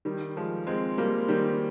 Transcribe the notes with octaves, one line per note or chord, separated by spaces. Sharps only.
D#3 G3
F3 G#3
G#3 C4
G3 A#3
D#3 G3